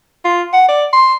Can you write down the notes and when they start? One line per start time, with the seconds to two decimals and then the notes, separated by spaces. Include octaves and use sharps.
0.25 F4
0.53 F#5
0.69 D5
0.93 C6